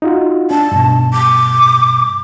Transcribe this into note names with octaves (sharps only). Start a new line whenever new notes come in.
D#4 F4 F#4
D4 A5
G2 B2
D6